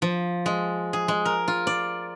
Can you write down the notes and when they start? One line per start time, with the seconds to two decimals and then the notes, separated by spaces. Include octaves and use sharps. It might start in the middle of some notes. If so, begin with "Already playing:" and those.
0.02 F3
0.46 G#3
0.93 G#4
1.08 G#3
1.25 A#4
1.48 F4
1.67 D5